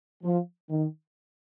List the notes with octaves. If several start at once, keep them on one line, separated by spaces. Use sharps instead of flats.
F3
D#3